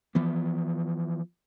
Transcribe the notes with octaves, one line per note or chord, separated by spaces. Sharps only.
E3 F3 B3